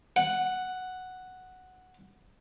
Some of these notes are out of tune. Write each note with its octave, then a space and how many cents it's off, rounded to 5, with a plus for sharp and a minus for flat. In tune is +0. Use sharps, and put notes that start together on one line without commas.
F#5 +0